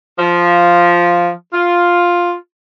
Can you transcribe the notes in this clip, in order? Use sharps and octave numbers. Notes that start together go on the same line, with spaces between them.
F3
F4